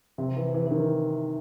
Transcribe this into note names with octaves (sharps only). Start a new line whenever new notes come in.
C3
E3
E3
E3
D#3